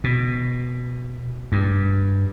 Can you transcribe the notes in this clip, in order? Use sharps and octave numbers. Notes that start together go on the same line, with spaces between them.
B2
G2